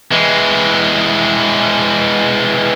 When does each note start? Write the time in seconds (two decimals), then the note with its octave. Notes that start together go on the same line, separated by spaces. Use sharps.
0.12 E3 G#3